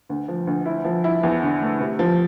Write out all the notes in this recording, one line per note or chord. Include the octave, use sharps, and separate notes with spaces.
D2
F3
D2
E4
F3
E4
E2
D3
A3
C3
F3